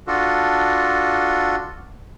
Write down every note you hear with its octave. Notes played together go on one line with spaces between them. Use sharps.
D4 F4 F#4 A4